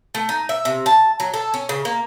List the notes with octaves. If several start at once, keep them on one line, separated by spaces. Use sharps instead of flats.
A3
D#4
E5
C3
A5
F#3
A4
C#4
C#3
A#3